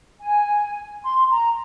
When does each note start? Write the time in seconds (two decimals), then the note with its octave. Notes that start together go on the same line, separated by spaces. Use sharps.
0.21 G#5
1.04 C6
1.31 A#5